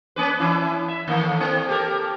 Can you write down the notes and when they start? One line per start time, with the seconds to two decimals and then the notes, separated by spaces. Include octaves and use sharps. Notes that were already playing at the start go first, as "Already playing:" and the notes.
0.16 A#3 C#4 B4
0.40 E3 C#4 E4
0.88 E5
1.07 A2 D#3 A#3
1.40 A#3 C4
1.69 G4 A4 A#4